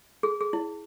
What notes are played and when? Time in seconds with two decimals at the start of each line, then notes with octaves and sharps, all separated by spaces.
0.23 G#4
0.41 G#4
0.53 E4